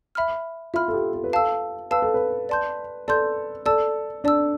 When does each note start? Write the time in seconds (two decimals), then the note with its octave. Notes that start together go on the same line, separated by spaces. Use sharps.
0.15 E5 B5 F6
0.74 F4 E5 B5 F6
0.88 A4
0.93 G4
1.14 A4
1.24 B4
1.33 A4 F5 A5 E6
1.91 B4 F5 A5 E6
2.02 A4
2.14 B4
2.49 D5 A5 C6 G6
3.08 A4 D5 A5 C6 G6
3.66 A4 D5 A5 E6
4.24 D4 D5 A5 E6